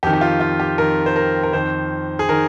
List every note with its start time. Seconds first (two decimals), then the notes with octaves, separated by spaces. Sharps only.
0.03 F2 D#3 G4
0.13 G4
0.21 F4
0.40 F4
0.60 G4
0.78 F2 D#3 A#4
1.06 C5
1.16 A#4
1.43 A#4
1.53 F2 D#3 C5
2.19 G#4
2.29 D#3 A#4